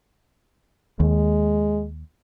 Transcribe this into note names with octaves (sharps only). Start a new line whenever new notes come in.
D#2 G#3